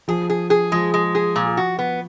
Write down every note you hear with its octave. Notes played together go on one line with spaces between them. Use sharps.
F3 G#4
G#4
G#4
F3 G#3
G#3
G#4
A#2
F#4
B3